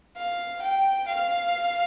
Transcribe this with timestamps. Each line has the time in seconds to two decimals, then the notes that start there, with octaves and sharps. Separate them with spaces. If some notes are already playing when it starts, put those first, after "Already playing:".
0.16 F5
0.62 G5
1.08 F5